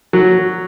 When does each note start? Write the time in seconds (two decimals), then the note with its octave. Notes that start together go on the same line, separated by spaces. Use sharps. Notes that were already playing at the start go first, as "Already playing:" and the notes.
0.13 F#3